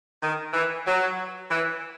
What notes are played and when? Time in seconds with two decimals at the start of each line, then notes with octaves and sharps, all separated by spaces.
0.22 D#3
0.53 E3
0.86 F#3
1.50 E3